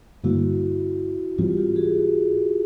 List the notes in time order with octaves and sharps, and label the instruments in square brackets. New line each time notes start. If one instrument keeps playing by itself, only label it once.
[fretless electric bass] G2 D3 G3 A#3 [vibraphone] E4 F#4
[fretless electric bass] G#2 E3 G3 C4 [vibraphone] F4 G4
[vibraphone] F4 G4
F#4 G#4